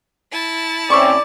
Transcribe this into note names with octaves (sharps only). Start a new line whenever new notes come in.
E4 A5
A2 C4 C#4 D5 E5 C#6